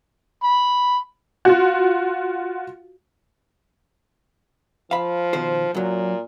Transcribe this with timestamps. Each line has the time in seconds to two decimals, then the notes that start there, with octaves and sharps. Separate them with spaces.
0.43 B5
1.45 F4 F#4
4.91 F3 F5 B5
5.33 B2 D#3 C5
5.75 F#2 A#2 F#3